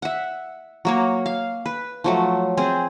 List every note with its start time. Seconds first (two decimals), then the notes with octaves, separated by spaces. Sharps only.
0.02 E5 F#5
0.85 F#3 A#3 C#5
1.26 F5
1.66 B4
2.04 F3 F#3 A3
2.57 C4 G#4